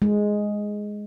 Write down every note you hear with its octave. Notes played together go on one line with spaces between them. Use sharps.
G#3